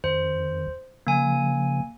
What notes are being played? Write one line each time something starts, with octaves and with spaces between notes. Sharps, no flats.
F2 D#3 C5
C#3 F3 A#3 G#5